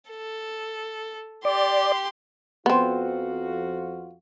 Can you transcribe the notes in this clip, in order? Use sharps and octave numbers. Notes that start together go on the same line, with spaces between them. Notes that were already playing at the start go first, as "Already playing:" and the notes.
A4
G4 D5 C6
F2 B3 C4 F4 F#4